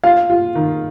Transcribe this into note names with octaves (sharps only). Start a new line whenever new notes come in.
F4 F5
F4
D#3